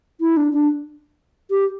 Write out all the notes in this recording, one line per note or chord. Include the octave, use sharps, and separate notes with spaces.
E4
D4
D4
G4